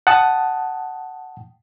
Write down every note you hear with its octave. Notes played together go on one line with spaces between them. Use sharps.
F#5 G5 A5 D#6